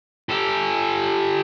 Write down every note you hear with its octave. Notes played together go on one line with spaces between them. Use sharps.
G4 A4